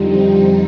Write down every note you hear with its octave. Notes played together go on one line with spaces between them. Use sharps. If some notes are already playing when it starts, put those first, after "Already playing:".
Already playing: F2 D3 F3 G3 C4 D#4